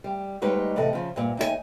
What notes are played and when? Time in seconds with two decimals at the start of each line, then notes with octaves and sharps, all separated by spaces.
0.04 G3
0.42 D2 G3 G#3 D#4 B4 C#5
0.76 E2 A2 C3 A4 D#5
0.93 C#3 F3
1.16 G2 A#2
1.37 D#2 D#4 F#4 G#5